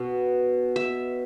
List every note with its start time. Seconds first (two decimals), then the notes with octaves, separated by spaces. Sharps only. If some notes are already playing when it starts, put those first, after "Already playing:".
Already playing: B2
0.76 E5